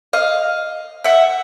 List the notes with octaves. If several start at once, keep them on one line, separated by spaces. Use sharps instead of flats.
D#5 F5
E5 F#5